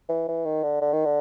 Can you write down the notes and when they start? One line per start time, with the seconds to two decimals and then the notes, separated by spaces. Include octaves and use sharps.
0.09 E3
0.28 E3
0.45 D#3
0.63 D3
0.81 D3
0.93 D#3
1.05 D3